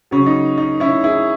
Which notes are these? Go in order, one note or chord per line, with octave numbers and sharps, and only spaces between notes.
C#3 F#3 C#4
D#4
D#4
C#4 E4
E4 G#4